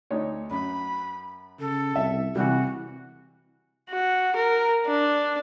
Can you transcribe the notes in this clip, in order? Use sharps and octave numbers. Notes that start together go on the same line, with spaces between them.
D2 D#4 C#5
F#2 B5
C#3 A4
C2 E5
C3 E3 G3 F#4
F#4
A#4
D4